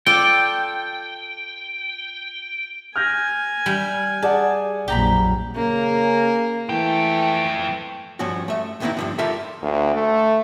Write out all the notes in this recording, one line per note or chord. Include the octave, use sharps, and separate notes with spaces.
F4 A4 D5 G5
G#5 F6 G6 A#6
G3
G#4 D5 F#5 A5
A#1 F2 F#3 G4 A#5 B5
C#3 A#3
F2 E3 A3 G5
G2 F3 C#4 F#4
A3 E5
D#2 D3 B3 C4 D#4 E4
G2 D3 F3
F4 G4 A4 A#4 E5 B5
D2
A3